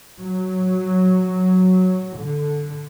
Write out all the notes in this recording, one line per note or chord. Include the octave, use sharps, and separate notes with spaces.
F#3
D3